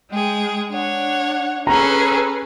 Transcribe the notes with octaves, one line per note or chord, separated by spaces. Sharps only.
G#3 G#4 G5
D4 C#5 F#5
C#4 G#4 A4 B4 A#5